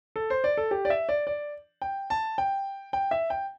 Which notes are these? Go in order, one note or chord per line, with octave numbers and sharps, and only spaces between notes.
A4
C5
D5
A4
G4
D5
E5
D5
D5
G5
A5
G5
G5
E5
G5